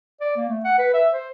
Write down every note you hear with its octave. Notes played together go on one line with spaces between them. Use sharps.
D5
A#3
A3
F#5
B4
E5
C5